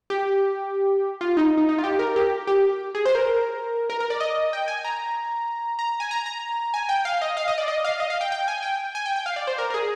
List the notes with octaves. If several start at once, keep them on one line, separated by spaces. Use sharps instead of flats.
G4
F4
D#4
D#4
D#4
F4
G4
A#4
G4
G4
G#4
C5
A#4
A#4
A#4
D5
D#5
G5
G#5
A#5
A#5
G#5
A#5
A#5
G#5
G5
F5
D#5
F5
D#5
D5
D#5
F5
D#5
F5
G5
G5
G#5
G5
G#5
G5
G5
F5
D5
C5
A#4
A#4
G#4